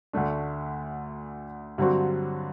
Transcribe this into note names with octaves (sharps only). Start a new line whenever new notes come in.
D2 D3 A3 D4
G2 D3 F#3 C4 F#4